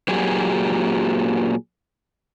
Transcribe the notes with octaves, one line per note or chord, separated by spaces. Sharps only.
A#2 F#3 G4 G#4